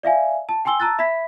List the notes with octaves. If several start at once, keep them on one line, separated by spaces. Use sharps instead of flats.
D5 E5 F5 G#5
A5
G5 G#5 C6 E6 G7
A5 A#5 E6 F#6 A6
E5 B5 G#6 B6